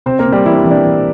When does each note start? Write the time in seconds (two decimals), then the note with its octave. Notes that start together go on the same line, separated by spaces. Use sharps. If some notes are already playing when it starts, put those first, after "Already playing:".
0.06 C3 C4 C5
0.19 A#3 A#4
0.26 C3
0.32 G3 G4
0.46 E3 E4
0.54 D4
0.63 E3 C4
0.71 D4
0.85 E3